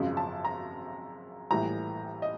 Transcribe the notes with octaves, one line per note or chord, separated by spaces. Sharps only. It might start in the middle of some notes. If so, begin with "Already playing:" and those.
Already playing: G#1 F#2 C#3 F3 G#3
A5
A#5
A#1 A2 E3 G3 A#5
D#5